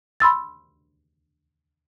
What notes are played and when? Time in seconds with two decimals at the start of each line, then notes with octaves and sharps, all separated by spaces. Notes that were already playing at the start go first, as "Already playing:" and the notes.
0.20 B5 C6 E6 A6